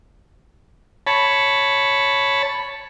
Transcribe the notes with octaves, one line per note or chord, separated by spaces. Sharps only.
C#5 A5 B5